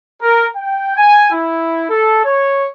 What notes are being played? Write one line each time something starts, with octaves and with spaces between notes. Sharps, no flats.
A#4
G5
G#5
E4
A4
C#5